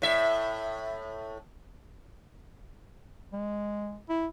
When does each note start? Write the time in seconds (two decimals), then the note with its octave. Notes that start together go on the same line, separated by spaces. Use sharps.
0.02 A2 E5
3.33 G#3
4.09 E4